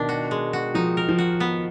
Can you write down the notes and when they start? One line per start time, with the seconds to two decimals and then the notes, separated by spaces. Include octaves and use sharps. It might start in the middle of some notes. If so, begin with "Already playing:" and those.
Already playing: B2 D#3 D4
0.09 F#4
0.31 G#3
0.53 F#4
0.75 F3 D#4
0.97 A#4
1.09 F3
1.18 F#4
1.40 B3